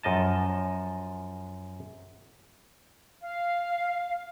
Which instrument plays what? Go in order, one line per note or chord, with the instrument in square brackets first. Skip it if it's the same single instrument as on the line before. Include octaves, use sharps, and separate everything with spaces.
[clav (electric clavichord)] F#2 F3 D#5 A5
[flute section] F5